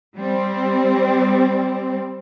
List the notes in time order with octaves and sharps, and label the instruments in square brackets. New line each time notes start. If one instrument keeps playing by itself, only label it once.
[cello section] G3 C4